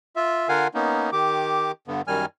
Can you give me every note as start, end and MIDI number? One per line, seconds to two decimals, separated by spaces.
0.16 0.48 65
0.16 0.48 76
0.49 0.68 50
0.49 0.68 65
0.49 0.68 70
0.49 0.68 77
0.49 0.68 78
0.49 0.68 80
0.74 1.10 58
0.74 1.10 59
0.74 1.10 61
0.74 1.10 63
1.12 1.72 51
1.12 1.72 67
1.12 1.72 86
1.88 2.02 43
1.88 2.02 50
1.88 2.02 59
2.07 2.26 42
2.07 2.26 51
2.07 2.26 55
2.07 2.26 80
2.07 2.26 89